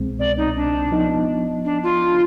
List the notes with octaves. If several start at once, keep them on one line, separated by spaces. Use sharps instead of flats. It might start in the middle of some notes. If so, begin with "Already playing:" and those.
Already playing: C2 B2 G#3 C4
D5
D#4
D4
F3 B3 D#4
D4
F4